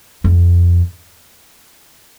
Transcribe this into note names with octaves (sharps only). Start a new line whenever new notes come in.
F2